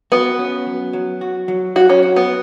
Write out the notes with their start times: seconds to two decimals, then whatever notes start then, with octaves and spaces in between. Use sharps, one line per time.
0.12 B3 F#4
0.39 C#4
0.66 F#3
0.93 F#3
1.21 F#4
1.48 F#3
1.76 F#3 F#4
1.90 C#4
2.03 F#4
2.16 B3